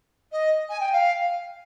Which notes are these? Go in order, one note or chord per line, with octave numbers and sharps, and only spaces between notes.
D#5
G#5
G5
F5